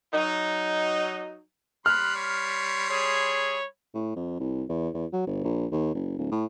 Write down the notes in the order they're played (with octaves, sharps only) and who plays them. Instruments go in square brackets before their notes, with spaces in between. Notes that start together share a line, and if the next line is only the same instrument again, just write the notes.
[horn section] F#3 D#4
[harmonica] G3 B5 C6 [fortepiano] F6 [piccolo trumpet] F#6
[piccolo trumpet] C#5
[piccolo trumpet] G#4 [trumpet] C#5
[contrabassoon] A2
F2
C2
E2
E2
F#3
G1
A#1
D#2
F#1
D1
A2